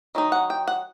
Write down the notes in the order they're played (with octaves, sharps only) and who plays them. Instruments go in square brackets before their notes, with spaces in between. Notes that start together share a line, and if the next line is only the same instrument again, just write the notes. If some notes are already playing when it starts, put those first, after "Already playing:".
[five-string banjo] D#3 F#3 D#4
F#5
G5
F#5